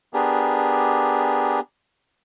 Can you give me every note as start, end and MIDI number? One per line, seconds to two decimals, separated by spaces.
0.14 1.60 59
0.14 1.60 62
0.14 1.60 67
0.14 1.60 68
0.14 1.60 70